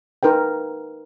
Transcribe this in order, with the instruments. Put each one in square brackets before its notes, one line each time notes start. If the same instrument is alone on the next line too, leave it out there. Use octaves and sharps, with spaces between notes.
[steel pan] D#4 A#4 B4 G5